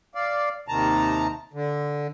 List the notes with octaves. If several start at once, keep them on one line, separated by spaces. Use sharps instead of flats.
D5 F5
D#2 C3 D#3 A5 A#5
D3